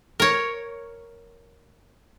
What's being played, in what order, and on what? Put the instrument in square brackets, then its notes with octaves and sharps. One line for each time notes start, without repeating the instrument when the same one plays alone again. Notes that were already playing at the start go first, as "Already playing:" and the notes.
[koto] A#4 C#5